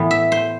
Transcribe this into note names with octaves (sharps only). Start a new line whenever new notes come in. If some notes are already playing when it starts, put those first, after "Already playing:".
Already playing: A2 E3 B3
E5
C5